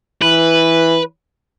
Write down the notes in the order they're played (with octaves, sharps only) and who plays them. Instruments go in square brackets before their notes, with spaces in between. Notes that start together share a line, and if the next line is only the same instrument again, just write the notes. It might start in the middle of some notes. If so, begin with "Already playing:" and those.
[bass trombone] E3 [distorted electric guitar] B4